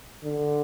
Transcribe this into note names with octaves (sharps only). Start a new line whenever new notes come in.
D3